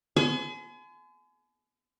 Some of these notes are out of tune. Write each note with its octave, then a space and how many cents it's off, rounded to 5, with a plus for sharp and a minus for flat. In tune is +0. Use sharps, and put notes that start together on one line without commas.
G#5 +35 C6 -45